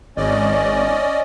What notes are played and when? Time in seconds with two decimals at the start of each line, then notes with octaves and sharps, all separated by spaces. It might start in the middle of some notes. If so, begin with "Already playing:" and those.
0.17 G#1 C#4 D5 D#5